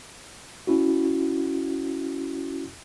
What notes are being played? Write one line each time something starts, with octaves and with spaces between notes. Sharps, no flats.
C#4 E4 F#4